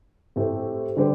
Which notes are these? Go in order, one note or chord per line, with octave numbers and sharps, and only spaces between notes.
A2 A3 C4 G4 C5
D3 G3 D4 G4 C5